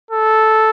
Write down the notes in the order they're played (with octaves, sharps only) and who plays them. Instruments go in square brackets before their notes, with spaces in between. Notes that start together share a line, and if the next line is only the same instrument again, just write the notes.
[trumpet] A4